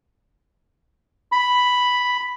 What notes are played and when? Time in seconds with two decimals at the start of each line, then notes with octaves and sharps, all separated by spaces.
1.32 B5